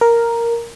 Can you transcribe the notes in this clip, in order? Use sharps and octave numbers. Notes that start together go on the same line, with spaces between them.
A#4